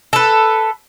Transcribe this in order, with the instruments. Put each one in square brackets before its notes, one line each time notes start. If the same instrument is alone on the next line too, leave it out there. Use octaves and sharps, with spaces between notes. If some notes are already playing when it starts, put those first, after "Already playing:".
[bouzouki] A4 B4